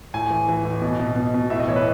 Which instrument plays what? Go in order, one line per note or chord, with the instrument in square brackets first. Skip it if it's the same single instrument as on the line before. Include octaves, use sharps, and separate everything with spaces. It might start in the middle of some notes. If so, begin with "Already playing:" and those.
[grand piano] A2 G#5
E3
E3
A2
B2
B2
B2
B2
A2 E5
D#5
E3 C#5
B4